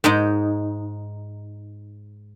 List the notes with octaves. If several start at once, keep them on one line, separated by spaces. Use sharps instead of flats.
G#2 G#3 D#4